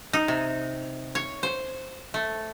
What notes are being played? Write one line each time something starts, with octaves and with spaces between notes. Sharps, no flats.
D#4
C3
C#5
C5
A3